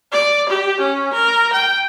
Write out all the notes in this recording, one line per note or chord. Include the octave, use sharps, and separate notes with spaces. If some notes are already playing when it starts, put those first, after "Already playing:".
D5
G4
C#4
A#4
G5